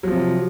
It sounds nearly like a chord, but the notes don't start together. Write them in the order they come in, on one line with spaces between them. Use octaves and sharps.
F#3 F3 C3